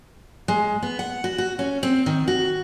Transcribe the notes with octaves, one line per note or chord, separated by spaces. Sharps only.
G#3
B3
F#5
F#4
F#4
C#4
C4
D#3
F#4